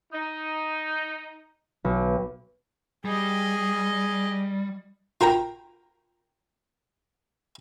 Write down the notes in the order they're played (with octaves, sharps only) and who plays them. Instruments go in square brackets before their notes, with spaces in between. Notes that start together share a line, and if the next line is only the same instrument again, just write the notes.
[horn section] D#4
[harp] B1
[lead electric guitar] G3 [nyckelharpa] G#4 D#5
[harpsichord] F4 A#4 G5 A#5